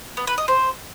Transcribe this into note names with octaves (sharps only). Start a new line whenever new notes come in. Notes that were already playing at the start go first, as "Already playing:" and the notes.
B3
B4
D#5
C5